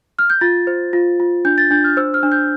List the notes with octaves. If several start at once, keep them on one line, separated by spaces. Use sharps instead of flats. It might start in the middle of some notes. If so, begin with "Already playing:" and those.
F6
G6
F4 A6
C5
F4
F4
D4 G6
A6
D4 G6
F6
C5 E6
F6
D4
G6